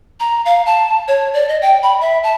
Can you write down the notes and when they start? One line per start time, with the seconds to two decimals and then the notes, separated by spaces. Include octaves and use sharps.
0.20 A#5
0.46 F5
0.66 A5
1.08 C#5
1.34 D5
1.49 D#5
1.62 G5
1.83 B5
2.01 E5
2.24 A5